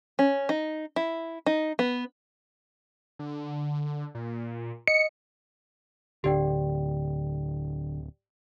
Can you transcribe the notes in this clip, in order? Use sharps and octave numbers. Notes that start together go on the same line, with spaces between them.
C#4
D#4
E4
D#4
B3
D3
A#2
D#5 C#7
D1 D3 G4 D5 G5